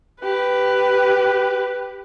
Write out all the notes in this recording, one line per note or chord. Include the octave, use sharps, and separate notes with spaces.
G4 B4